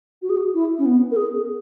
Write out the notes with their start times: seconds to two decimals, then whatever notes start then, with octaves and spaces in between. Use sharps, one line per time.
0.22 F#4
0.30 G#4
0.37 F#4
0.54 E4
0.78 C#4
0.86 B3
1.11 A#4
1.16 G#4